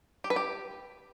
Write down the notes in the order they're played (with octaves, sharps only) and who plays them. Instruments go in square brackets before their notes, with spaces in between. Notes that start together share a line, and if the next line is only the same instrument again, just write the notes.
[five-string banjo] G4
B4
G4